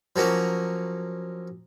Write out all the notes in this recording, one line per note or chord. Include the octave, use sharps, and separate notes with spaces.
F3 F#3 A#3 C#4